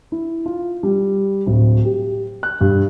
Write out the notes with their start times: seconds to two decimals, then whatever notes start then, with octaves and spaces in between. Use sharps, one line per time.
0.12 E4
0.46 F4
0.83 G3
1.46 D1
1.85 G4
2.43 F#6
2.61 G2